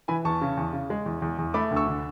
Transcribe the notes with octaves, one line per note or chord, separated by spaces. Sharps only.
E3 G#5 B5
E2 A5 C#6
C#3
E2
C#3
G#3
E2
E2
E2
A3 B5 D6
D2
C#6 E6
D3